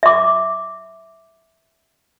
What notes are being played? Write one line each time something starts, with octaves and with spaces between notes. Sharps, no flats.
E5 D6